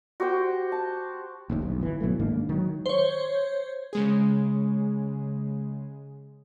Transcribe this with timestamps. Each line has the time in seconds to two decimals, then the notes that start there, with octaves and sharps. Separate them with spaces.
0.20 F#4 G4 C5 G5
0.72 A5
1.50 F1 A#1 D#2
1.62 B1
1.81 G1 E3
2.01 G#1 B2 F#3 A3
2.19 G#2 D#3 A#3 D4
2.49 D#3 F#3
2.86 C5 C#5
3.93 C#3 G#3 G#4